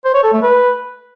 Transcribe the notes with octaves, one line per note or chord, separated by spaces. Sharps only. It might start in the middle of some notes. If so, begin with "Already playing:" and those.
C5
C#5
A4
A3
B4